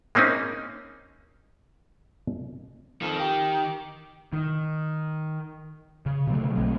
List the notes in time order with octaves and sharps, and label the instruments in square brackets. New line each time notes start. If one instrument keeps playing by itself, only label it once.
[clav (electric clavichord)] G#3 A#3 C4 C#4 D#4
[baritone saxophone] F2 [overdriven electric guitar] D#3
[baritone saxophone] G4
[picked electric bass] D#3
C#3
B2 D3 F#3 A3
B1 G#3 A3 C4